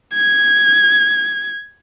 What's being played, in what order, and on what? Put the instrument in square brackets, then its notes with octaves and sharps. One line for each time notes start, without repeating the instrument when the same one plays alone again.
[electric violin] G#6